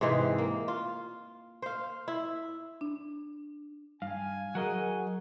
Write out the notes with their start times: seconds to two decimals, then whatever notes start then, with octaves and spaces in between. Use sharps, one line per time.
0.01 G#2 C3 E3 G#3
0.38 A#3
0.68 F4
1.62 C5 F5
2.08 E4
2.81 D4
4.02 G2 F5 G#5
4.55 F#3 G#4 A#4 D#5 F#5